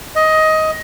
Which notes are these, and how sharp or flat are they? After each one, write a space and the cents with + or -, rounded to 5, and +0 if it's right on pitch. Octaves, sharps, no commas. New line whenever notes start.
D#5 +15